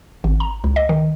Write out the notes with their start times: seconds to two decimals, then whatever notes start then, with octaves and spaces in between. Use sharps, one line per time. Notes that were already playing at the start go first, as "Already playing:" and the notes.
0.24 G#1
0.40 A#5
0.64 C#2
0.76 D#5
0.89 D#3